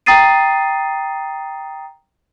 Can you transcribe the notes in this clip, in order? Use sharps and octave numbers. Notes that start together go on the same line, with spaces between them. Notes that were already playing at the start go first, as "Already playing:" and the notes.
G5 A#5 D#6 A6 C7 D#7